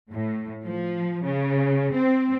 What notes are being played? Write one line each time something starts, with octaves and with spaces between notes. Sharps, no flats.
A2
F3
C#3
C4